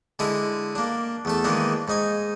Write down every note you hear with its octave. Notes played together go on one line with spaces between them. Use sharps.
D3 G#3 E4 G#4
A#3 D4
E2 A3 A4
D#3 E3 G#3 A#3 D4 D#4
G#2 D#4 G#5